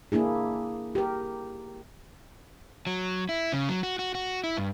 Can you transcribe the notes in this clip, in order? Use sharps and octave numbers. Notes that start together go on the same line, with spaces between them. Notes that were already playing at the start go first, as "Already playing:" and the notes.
A#3 D4 E4 G#4
G4 A#4
F#3
E4
C#3
F#3
F#4
F#4
F#4
E4
G2